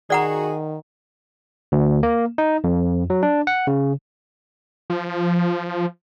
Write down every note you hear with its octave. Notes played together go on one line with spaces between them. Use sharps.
D#3 F#4 G#4 D5 F#5 A#5
D2
A#3
D#4
F2
F#3
D4
F#5
C#3
F3